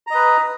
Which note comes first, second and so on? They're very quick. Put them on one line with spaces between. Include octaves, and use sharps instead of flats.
A#5 D#5 B4